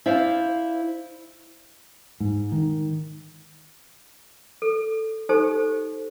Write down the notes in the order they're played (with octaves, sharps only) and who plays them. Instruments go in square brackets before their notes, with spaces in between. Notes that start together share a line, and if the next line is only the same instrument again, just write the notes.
[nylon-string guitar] E4 C5 D5 F5
[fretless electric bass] G#2
D#3
[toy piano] A4
D#4 G4 A4 C5